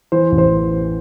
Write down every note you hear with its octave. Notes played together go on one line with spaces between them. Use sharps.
E3 C5
A1
C5